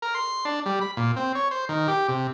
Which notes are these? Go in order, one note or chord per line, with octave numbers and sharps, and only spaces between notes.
A#4
C6
D4
G3
B5
A#2
C4
C#5
C5
D#3
G4
C3